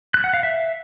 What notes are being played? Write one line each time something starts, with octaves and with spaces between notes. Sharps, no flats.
F#6
F#5
F5
E5